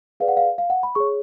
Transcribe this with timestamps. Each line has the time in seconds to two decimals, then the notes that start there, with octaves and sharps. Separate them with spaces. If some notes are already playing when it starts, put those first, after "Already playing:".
0.20 G#4 B4 D5 F5
0.28 F#5
0.37 F5
0.58 F5
0.70 F#5
0.83 B5
0.95 G#4 C#5 C#6